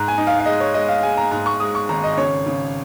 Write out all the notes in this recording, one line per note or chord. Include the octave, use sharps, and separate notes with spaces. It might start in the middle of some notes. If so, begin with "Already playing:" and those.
Already playing: G#2 A#5
G#5
D#4
F5
F5
G#3 D#5
C#5
G#3 D#5
F5
G#3 G#5
A#5
G#2 A#5
C#6
G#3 D#6
C#6
G#1 A#5
D#5
C#3 C#5
C#3